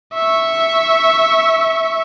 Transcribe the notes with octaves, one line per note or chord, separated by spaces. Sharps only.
E5 C#6